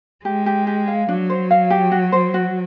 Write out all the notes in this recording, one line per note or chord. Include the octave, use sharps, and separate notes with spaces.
G#3 G4
G4
G4
F5
F#3 D4
C5
F5
G4
F#4
C5
F#4